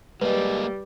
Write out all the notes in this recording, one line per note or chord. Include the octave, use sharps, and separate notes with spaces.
G3 G#3 A#3 B4 D#5